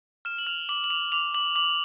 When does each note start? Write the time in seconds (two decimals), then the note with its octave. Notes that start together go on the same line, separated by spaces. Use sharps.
0.25 F6 E7
0.38 F#7
0.47 F6 F7
0.69 D6 F#7
0.84 F#7
0.90 D6 F7
1.12 D6 F7
1.34 D6 F#7
1.56 D6 F#7